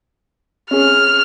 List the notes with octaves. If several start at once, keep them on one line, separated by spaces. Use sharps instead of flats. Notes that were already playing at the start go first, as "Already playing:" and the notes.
C#4 G#4 F6